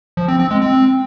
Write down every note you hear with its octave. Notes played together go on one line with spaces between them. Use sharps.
F3
C4
C4
G#3
C4